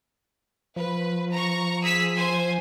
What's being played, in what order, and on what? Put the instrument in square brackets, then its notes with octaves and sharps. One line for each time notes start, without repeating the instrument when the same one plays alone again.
[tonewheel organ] F3 [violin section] B4
[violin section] A#5 C#6
G#4 E6 B6
C5 G#5